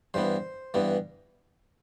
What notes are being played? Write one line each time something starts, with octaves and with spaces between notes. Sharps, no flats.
G2 E3 B3 C5
G2 E3 B3